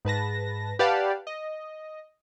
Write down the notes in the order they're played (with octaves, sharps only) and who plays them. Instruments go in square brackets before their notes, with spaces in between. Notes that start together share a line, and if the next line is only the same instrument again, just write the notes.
[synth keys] G#2 B4 A5 A#6
G4 B4 D5 F5 F#5 A5
D#5